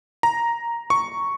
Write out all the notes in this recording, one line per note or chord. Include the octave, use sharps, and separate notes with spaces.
A#5
C#6